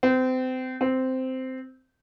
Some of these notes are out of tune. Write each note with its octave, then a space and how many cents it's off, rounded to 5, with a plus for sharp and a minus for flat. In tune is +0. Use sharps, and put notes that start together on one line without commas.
C4 -30
C4 -10